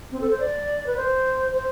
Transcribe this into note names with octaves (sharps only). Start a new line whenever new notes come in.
C4
A4
C5
D5
B4
C5
C5